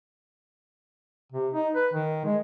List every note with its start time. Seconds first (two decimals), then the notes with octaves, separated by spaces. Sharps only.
1.32 C3
1.54 D#4
1.75 B4
1.93 D#3
2.25 G#3